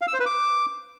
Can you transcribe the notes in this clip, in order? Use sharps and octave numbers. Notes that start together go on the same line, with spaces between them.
F5
E6
C5
B4
D6